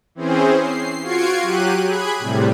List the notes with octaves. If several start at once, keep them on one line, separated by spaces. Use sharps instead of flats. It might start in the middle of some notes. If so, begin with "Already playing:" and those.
E3 C4 C#4 G#4 C5
C7
F4 F#4 C#6 G#6 C7 D7
F#3 G4 F#6 D#7
G#4 B5 F#6 G#6
A2 C3 G3